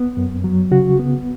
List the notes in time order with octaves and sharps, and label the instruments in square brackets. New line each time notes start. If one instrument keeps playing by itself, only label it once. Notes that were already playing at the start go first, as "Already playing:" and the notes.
Already playing: [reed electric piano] B3
F#2
F#3
C#3 F#4
B3